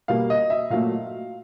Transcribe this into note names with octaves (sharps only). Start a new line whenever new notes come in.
B2 G3 A#3 F5
D#5
E5
A#2 F#3 A3 F5